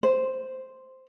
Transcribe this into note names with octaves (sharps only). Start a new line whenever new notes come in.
C5